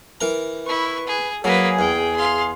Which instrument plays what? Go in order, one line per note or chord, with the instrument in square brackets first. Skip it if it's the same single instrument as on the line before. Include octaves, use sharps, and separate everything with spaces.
[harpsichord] E3 A#4 A#5
[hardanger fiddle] E4 C#6 [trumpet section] B4
[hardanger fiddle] G#4
[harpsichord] F#3 [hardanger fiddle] A#3 B4 [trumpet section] G#4
[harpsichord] E2 [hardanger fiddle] G5
[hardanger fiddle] F5 C6